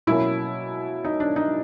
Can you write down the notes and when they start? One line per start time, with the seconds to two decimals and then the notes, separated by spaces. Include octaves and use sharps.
0.07 B2 F#3 A#3 C#4 E4
1.04 D#4
1.20 D4
1.36 D#4